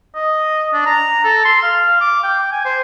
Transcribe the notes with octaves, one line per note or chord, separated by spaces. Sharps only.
D#5
D4
A#5
A4
C6
F5
D6
G5
G#5
C5